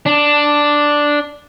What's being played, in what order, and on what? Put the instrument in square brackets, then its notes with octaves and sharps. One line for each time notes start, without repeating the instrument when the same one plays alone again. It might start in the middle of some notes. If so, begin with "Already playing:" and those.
[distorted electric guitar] D4